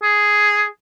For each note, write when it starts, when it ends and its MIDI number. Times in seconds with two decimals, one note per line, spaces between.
0.03 0.65 68